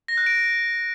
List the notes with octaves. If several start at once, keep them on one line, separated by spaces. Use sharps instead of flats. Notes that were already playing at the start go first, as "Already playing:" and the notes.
A#6
F#6
D7